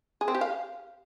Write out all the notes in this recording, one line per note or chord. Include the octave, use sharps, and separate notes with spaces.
G#4
C4
G4
F5